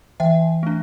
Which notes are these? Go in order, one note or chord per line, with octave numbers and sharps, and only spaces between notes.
E3 E5 G5
A3 D4